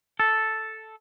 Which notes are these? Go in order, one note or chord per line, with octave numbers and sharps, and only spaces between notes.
A4